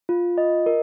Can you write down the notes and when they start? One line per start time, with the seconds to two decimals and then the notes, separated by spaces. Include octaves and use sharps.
0.09 F4
0.38 D#5
0.66 A#4